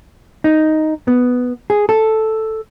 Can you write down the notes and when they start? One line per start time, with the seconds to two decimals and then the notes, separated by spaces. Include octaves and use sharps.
0.44 D#4
1.08 B3
1.70 G#4
1.89 A4